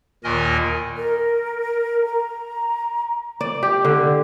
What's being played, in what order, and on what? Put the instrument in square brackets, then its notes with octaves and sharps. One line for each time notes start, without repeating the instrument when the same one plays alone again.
[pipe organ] D#2 A#2 D#3 A#4 D#5 G#5
[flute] A#4
A#5
[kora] D5
G4
D3